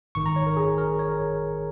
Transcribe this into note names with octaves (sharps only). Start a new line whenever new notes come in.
G#1 G#2 D#3 C#6
A#5
C#5
A#4
G#4
A#4
C#5